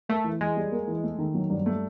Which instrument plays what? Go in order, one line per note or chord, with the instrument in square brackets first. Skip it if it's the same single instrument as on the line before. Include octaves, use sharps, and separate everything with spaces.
[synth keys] A3 [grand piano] A#3
[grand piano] E3
[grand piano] E3 [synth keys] G#3
[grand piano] G3
A#3
E3
A3
D#3
F#3
G2
A3